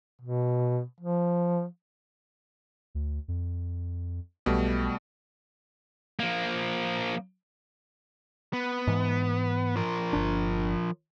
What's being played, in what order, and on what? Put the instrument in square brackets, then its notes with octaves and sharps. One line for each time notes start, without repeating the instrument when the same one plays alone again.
[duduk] B2
F3
[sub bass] D2
F2
[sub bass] B1 [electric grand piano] B2 G3 A3
[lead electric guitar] F3 A#3
B3
[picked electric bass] G#2 E3
[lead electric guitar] F3 A#4
[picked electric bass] G1 D4